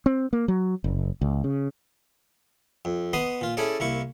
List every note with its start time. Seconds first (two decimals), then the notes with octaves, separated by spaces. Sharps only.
0.06 C4
0.33 A#3
0.48 F#3
0.84 F#1
1.21 C#2
1.44 C#3
2.85 F2
3.13 B3 D#5 B5 C6 D#6
3.41 A#2 F4
3.57 C#4 E4 G#4 A4 D5
3.80 C2 A#3 E4 C#6